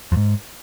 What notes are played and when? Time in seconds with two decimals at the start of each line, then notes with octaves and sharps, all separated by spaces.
0.12 F2
0.17 G#2